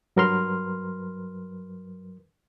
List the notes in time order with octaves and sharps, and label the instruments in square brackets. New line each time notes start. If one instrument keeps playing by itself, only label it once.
[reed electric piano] G2 F#3 A#4 B4 C6 F6